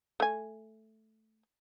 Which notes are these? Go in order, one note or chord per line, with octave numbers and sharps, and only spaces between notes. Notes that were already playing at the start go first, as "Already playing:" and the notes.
A3 G#5